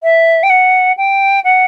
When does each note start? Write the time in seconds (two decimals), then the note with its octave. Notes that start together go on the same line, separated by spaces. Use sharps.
0.03 E5
0.43 G5
0.50 F#5
0.97 G5
1.44 F#5